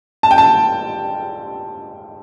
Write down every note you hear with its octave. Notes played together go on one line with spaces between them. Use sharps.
A5
G5
A5